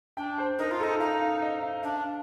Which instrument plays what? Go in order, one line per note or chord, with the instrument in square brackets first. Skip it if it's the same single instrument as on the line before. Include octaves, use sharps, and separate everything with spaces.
[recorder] D4 [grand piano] G5
[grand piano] C5
[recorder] D#4 [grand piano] A#4
[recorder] F4
[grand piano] A4
[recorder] D#4
[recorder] D#4 [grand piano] F5
[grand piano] F5
D#5
F5
[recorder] D4 [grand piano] F5